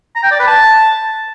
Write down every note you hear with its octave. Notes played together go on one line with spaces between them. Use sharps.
A#5
G5
D5
B4
A5